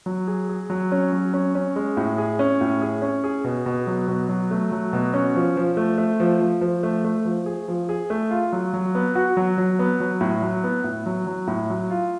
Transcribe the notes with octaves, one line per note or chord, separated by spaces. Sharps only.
F#3
G#4
G#4
F#3
C#4
F#3
C#4
C#4
G#3
A2
G#4
C#4
A2
G#4
C#4
G#4
B2
B2
F#3
B2
F#3
A3
F#3
B2
C#4
F3
F3
A3
A3
F3
F3
F3
A3
A3
F3
G#4
F3
G#4
A3
F4
F#3
F#3
B3
F#4
F#3
F#3
B3
F#3
A2
F#3
B3
A2
F#3
F#3
A2
F#3
F4